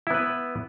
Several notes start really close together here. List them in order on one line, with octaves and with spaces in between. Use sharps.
E4 B3 B4